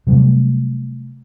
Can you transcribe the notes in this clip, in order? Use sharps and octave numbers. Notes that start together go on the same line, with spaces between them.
C3 F#3 G3 A3